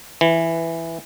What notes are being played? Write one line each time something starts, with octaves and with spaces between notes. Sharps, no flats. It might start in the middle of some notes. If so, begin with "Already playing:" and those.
E3